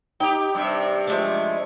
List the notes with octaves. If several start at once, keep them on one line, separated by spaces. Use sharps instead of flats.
D#4 G4 G5
G2 C3 E5
F3 G#3 A3